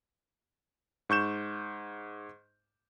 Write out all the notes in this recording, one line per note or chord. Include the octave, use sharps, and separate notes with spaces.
G#2 C#6 G6 E7